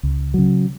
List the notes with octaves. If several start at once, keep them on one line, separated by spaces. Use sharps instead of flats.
C#2
C#3 F#3